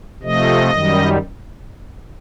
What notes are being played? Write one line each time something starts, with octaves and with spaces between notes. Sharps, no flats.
C3 F3 A3 D#5
F#2 D#3 G3